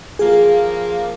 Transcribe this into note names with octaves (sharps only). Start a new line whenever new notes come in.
F3 A#3 G#4